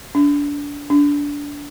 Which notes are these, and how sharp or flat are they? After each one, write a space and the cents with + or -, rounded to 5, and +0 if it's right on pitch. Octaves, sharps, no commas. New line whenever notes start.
D4 -25
D4 -20